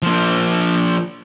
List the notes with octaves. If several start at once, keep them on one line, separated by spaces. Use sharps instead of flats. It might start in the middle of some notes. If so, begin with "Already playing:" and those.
F3 A#3